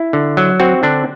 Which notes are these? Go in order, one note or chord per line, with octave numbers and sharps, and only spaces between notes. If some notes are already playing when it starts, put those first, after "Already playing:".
Already playing: E4
D3
F#3
C4 F#4
D3 D4